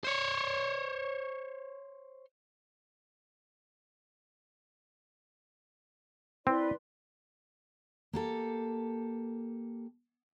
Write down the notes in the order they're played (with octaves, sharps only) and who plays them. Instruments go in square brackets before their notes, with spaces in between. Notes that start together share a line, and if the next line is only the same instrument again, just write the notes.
[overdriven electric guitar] C5 C#5
[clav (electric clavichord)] C4 [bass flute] E4 [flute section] B4 D5 C6
[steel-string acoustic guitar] A#3 G4 A4